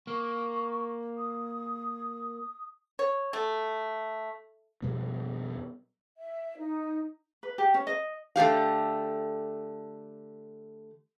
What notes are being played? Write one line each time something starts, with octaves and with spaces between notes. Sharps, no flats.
A#3 C#6
D#6
C#5
A3
F2 B2 G3 B3
E5
D#4
B4
G4
C#4
D#5
D3 A3 G4 F5